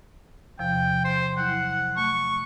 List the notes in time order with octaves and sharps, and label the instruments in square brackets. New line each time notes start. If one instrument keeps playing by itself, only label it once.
[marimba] E2 C3 F3 [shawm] G5
[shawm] C5
[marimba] F#3 E4 [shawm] F#5
[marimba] A3 [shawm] C#6